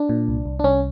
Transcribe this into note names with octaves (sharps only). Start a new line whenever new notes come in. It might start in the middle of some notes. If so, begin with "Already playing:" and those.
Already playing: D4
A#2
C2
C2
D4
C2 C#4